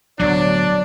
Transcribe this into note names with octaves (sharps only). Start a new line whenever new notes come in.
D1 D2 B2 F#3 D4 D5